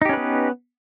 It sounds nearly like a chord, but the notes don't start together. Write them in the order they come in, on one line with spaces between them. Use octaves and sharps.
D#4 G4 C#4 B4 B3